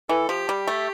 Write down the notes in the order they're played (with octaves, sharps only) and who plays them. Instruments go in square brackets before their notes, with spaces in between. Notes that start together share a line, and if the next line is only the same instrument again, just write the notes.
[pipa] E3 [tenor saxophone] A4
[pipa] F3 [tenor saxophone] G4
[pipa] G3
A3